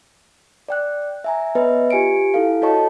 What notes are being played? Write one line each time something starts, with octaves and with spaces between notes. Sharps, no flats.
D5 G5 F#6
E5 G#5 A#5
B3 B4 C#5 D#5 E5
F4 G4 G#5 C#7 D7
E4 A4 F5
F#4 A4 C#5 D#5 A5 C#6